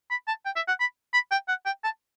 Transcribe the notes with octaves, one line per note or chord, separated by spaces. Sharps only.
B5
A5
G5
E5
F#5
B5
B5
G5
F#5
G5
A5